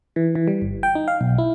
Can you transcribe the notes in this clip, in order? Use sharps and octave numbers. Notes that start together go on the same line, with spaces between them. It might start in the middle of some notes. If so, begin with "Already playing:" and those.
E3
E3
G3
G1
G5
D#4
F5
B1
E4